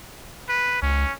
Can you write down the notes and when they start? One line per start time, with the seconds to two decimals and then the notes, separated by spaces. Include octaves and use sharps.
0.49 B4
0.82 C#2 C#4